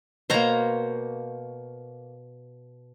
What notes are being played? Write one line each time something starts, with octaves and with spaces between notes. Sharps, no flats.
B2 A#3 C5 C#5 A#5